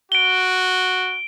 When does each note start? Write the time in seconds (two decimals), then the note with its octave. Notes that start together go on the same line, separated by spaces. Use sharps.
0.12 F#4 D7 G7